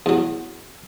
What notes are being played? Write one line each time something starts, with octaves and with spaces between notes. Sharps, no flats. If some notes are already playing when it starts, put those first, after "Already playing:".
E2 F#3